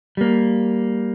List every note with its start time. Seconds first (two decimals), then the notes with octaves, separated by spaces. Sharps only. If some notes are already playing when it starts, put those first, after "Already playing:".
0.17 G3 A#3